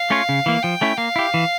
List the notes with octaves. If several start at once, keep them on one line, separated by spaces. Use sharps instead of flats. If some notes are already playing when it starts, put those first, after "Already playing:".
Already playing: F5
A3 C#4 F4 C#5
C#3
E3 A#3
F3 G5
A3 C#4 E4
A#3 F5
E4 G4
E3